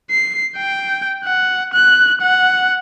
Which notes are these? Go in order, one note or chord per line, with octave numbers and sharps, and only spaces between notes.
C7
G5
F#5
F#6
F#5